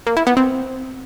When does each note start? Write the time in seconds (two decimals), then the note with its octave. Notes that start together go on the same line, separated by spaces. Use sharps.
0.07 A#3
0.17 E4
0.27 B3
0.37 C4